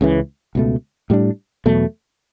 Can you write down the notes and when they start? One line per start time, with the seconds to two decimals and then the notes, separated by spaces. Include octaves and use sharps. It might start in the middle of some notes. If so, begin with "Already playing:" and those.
0.01 C#2 C#3 E3
0.55 C#2 B2 A3
1.10 A2 G3 D4
1.66 E2 B2 F#3 A3